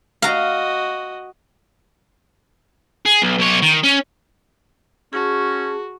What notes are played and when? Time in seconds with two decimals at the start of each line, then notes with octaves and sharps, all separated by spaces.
0.22 F#4 D#5 F5 A#5
3.06 G#4
3.22 B1
3.39 B1 C#5
3.63 D#3
3.84 C#4
5.13 C#4 F#4 G#4 A5